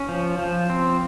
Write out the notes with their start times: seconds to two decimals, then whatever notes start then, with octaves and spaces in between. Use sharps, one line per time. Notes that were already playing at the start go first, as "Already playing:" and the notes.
Already playing: C#4
0.09 F3
0.39 F3
0.70 C4